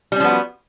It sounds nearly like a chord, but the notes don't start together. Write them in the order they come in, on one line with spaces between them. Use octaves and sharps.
G3 C#4 F3 B3 F#4